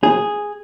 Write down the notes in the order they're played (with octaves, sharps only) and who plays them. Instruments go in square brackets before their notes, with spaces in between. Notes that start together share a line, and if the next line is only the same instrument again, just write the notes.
[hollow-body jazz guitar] G#4